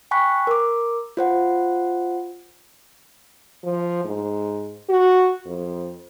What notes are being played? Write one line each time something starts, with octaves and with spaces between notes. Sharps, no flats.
G5 G#5 B5 C#6 F#6 B6
A#4 D6
F4 C5 F#5
F3
G#2
F#4
F2